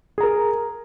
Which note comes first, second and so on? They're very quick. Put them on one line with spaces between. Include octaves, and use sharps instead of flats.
G#4 A#5 A#4